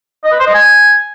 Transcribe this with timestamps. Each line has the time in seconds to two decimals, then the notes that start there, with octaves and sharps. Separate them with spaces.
0.24 D#5
0.32 B4
0.39 C5
0.47 D#5
0.54 G#5